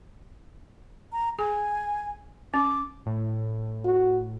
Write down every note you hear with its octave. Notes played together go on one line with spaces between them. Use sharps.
A#5
G#4 G#5
C#4 D6
A2
F#4